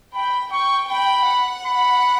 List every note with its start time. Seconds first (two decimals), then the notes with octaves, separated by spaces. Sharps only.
0.14 G5 B5
0.52 G5 C#6
0.90 G5 B5
1.28 F#5
1.66 B5